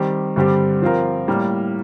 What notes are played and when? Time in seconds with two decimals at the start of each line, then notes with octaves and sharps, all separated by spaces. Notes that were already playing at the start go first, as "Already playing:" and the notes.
Already playing: D#3 G3 C4 G4
0.36 G2 D3 G3 C4 G4
0.82 F3 C4 F4 A#4
1.28 A2 G3 A#3